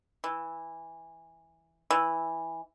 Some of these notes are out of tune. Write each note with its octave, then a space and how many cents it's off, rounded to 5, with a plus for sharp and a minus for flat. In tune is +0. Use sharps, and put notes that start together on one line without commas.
E3 -5
E3 -5